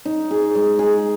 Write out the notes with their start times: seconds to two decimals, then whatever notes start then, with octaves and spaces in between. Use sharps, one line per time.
0.05 D#4
0.31 G#4
0.55 G#3
0.79 G#4